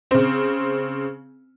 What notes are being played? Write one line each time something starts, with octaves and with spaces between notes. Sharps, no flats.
C#3 C4